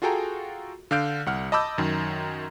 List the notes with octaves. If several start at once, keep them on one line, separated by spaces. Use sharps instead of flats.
F4 F#4 G#4 A4 G5 A#5
D3 D4 F5 F6 G6 D7
C2 F#5 F6
D#5 A5 B5 D6 E6 G6
F#2 D#3